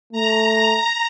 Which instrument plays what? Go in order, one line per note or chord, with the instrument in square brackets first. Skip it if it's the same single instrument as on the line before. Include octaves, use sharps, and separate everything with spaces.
[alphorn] A3 [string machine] A#5